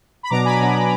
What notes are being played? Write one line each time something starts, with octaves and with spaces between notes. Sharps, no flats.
B5
B2 F#3 B3 D4 A#5 D6
G#5 B5
B2 F#3 B3 D4